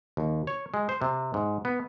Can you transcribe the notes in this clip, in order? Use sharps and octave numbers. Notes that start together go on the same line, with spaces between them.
D#2
C#5
G#3
C5
C3
G#2
B3